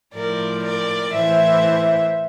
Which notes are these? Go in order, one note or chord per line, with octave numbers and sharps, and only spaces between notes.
A2 F3 A#4 D5
A#4 D5
A2 E3 C5 E5